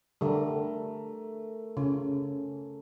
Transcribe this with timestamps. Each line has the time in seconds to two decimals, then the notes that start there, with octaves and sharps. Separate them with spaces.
0.21 D3 G3 A3 A#4
1.77 C#3